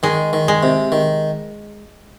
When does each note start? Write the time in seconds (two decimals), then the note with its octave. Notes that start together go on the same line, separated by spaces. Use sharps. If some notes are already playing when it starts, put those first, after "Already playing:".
0.03 D#3 G#3
0.33 D#3
0.48 G#3
0.63 C3
0.92 D#3